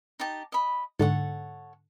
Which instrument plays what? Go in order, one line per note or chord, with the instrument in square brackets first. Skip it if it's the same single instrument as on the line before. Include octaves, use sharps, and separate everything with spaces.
[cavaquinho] D#4 G4 A5
D#5 B5
[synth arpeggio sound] G#2 D3 [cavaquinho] A4 C#5 F#5